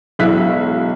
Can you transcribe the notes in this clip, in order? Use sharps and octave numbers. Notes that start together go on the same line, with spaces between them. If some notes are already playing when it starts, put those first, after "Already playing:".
E1 B1 E4 F#6 B6